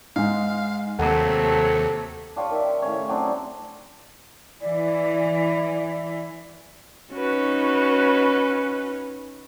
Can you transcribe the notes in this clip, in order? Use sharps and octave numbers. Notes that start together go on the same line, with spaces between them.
G#2 G#3 F5
D#2 C3 F#3 A3 A4 F#5
D4 F4 G4 C#5
D#3 E5
A2 C#3 C#5
F#3 C4 D4 D#4
E3 D5
C#4 D#4 F#4 B4